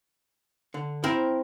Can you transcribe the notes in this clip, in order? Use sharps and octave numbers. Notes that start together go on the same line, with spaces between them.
D3
C4 E4 A#4